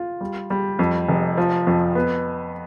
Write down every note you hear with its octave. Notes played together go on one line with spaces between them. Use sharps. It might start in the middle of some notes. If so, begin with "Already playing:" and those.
Already playing: F4
G3
G3
F2
F1
F3
F2
B3